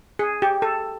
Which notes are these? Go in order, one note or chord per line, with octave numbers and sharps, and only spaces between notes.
G#4
G4
A4